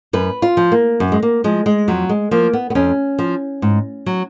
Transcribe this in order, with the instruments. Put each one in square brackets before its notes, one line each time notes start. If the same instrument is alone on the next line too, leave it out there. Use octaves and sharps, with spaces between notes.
[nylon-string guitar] F#2 B4
F4
F3
A#3
F#2
G#3
A#3
F3 G#3
G#3
F2 F#3
G#3
F3 A#3
B3
B3
F2 C#4
F3
G#2
F#3